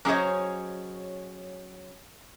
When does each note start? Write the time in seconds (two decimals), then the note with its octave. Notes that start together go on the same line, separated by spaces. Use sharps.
0.05 F#3 C#4 G#4 C5 C#5 D#5